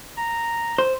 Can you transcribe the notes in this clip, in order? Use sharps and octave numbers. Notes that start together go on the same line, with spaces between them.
A#5
C5